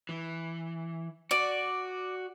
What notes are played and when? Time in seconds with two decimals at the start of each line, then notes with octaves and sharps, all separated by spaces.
0.09 E3
1.31 F#4 D5